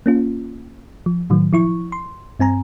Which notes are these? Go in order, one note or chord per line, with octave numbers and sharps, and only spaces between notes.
A#3 C#4 F4
F3
A2 D#3 F#3
F3 E4 C#6
C6
G2 C4 G#5 A#5